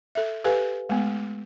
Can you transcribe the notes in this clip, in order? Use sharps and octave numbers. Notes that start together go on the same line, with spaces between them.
A4 E5
G4 A4 B4 F5 G#5
G#3 A3 B3